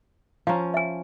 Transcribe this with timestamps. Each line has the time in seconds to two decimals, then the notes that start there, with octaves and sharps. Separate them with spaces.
0.47 F3 C#4 F5 A#5
0.74 E5 G#5